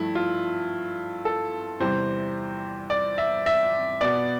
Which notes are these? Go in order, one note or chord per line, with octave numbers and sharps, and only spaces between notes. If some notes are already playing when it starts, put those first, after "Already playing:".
Already playing: G2 F3 A3 E4
F4
A4
E2 C3 E3 G3 C5
D5
E5
E5
B2 B3 D5